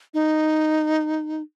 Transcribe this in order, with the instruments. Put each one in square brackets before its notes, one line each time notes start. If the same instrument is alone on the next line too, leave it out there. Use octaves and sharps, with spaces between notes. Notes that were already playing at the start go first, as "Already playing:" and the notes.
[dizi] D#4